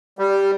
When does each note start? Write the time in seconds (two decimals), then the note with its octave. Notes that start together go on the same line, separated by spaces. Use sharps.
0.19 G3